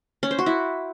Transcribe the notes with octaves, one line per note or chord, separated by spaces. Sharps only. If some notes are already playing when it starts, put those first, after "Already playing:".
C#4
C5
F#4
E4